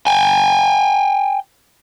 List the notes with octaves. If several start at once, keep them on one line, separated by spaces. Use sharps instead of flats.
G5 G#5